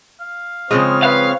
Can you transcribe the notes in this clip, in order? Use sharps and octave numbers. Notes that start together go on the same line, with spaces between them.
F5
C#3 F3 G#3 C4 C#5 F6
B4 F5